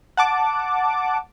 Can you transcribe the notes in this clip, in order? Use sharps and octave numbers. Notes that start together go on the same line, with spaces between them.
F#5 A5 D6